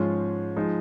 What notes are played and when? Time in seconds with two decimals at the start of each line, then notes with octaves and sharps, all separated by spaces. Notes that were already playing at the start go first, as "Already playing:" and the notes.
Already playing: G#2 F3 G#3 C#4 F4
0.56 F3 G#3 D#4